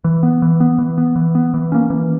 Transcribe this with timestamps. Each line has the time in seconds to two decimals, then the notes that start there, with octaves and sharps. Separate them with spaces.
0.04 E3
0.23 B3
0.42 E3
0.60 B3
0.79 E3
0.98 B3
1.16 E3
1.35 B3
1.54 E3
1.72 A#3 C#4
1.90 E3